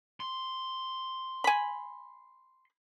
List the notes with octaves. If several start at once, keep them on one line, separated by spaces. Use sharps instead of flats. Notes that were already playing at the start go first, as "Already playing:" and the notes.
C6
G#5 B5